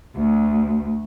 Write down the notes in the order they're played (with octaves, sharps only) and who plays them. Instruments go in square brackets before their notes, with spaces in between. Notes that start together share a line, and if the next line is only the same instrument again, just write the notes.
[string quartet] D2